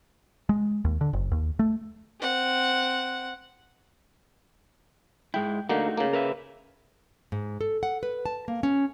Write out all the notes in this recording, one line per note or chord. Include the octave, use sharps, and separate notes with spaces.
G#3
D#2
D3
F#1
D#2
A3
C4 F#5
G#2 G#3 E4 G5
D3 A3 A#3 D#4 F#4
C#3 A#3
A#4 B4 E5
G#2
A4
F#5
B4
A5
A#3
C#4